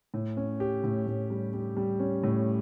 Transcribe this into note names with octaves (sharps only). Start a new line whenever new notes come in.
A2
C#4
G4
A2
A2
G3
G3
G3
C#4
A2